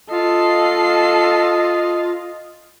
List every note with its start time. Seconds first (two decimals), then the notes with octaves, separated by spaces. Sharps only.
0.11 F4 A4 D#5 C7